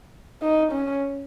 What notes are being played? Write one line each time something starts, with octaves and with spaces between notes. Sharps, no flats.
D#4
C#4